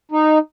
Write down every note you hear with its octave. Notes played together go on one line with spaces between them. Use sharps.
D#4